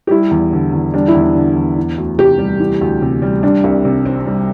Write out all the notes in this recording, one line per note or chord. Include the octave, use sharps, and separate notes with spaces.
G4
G3 E4
E2
D3
E2
G3 D4
E4
E2
D4
D3
E2
E3
D2
C3 G4
G3
E3
D2
C3
G3
G3 D4
C2
C3
C4
G3